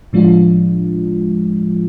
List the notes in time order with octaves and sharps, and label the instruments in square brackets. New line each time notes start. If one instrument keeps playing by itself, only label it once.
[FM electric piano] A2 F3 G#3 D4 F4